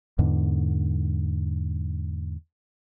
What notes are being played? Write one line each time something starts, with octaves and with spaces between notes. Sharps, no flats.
E2 G#2 D3